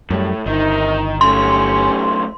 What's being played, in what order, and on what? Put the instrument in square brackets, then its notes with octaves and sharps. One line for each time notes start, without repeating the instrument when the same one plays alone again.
[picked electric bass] F#2 G3 [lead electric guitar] A2
[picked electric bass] G1 [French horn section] C3 D#4 A#4 [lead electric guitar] D#3
[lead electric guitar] F#2 A3 [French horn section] C#4 G4 [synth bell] C6